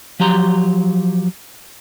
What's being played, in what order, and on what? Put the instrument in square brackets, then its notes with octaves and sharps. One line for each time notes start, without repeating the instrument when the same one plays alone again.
[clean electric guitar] F3 F#3 G4 A#5 C6